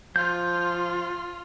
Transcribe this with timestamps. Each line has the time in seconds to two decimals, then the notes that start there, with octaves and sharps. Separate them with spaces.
0.16 F3 F4 G6